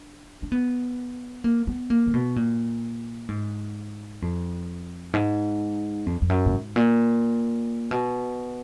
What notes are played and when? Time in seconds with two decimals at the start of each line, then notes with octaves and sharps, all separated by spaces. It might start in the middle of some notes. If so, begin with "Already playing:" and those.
Already playing: D4
0.42 D4
0.52 B3
1.44 A#3
1.67 B3
1.90 A#3
2.07 D3
2.14 B2
2.36 A#2
3.29 G#2
4.22 F2
5.13 G#2
6.06 F2
6.22 F2
6.30 F#2
6.46 A#2
6.53 G#2
6.76 A#2
7.91 B2